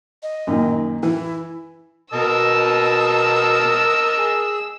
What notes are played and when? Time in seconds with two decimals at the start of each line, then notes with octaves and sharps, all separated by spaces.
0.23 D#5
0.47 F#2 A#2 D#3
1.03 E3 E4
2.13 B2 A#4 D#5 A5 E6
4.18 G#4